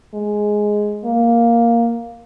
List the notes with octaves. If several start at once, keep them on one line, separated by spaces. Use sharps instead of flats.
G#3
A#3